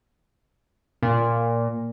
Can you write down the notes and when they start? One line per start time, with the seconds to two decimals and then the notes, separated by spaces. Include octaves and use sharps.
1.03 A#2